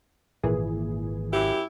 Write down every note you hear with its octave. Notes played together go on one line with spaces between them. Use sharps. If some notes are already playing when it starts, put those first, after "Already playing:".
G#1 A#2 E3 G#4
F#2 E4 G4